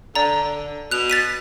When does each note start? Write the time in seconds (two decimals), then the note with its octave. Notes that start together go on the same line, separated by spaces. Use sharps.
0.15 D3 D5 A#5
0.91 B2 F#6 F7
1.10 A6 B6 D#7